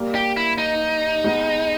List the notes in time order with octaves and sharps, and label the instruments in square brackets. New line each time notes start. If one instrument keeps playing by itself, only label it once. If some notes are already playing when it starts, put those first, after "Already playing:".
Already playing: [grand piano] G3 A#3
[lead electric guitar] G4
E4
D#4
[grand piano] G#3 B3